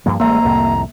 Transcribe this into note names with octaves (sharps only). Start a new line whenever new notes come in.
G2 F3 A#3
A1 G#3 A#3 E5 A#5
C2 F2 A2